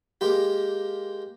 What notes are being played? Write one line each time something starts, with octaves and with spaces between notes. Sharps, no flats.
G#3 A#3 G4